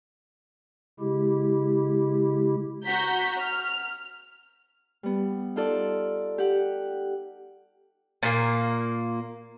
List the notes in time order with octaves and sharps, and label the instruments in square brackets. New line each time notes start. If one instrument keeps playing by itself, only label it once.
[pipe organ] C#3 G#3 E4 G4
[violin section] F#4 A#5 G6 B6
F6
[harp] G3 B3
D#4 F4 A4 D5
G4 F#5
[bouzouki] A#2 A#3